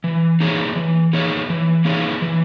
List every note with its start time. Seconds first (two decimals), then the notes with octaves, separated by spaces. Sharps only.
0.04 E3
0.40 A#3 D#4 G#4 C#5
0.76 E3
1.13 A#3 D#4 G#4 C#5
1.50 E3
1.85 A#3 D#4 G#4 C#5
2.22 E3